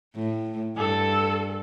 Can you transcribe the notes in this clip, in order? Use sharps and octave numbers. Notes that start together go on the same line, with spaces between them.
A2
G2 A4